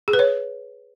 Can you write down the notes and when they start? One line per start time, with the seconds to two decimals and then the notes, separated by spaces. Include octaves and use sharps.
0.08 G#4
0.13 B4
0.19 C#5